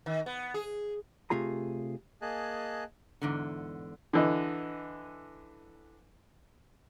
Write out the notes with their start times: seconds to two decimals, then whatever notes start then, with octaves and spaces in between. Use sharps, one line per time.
0.06 D#3
0.26 B3
0.54 G#4
1.30 C3 A3 F4 G#4 A#5
2.22 A#3 G#4 D#5 G#5 A5 F#6
3.22 E2 G#2 D3
4.13 D3 E3 D#5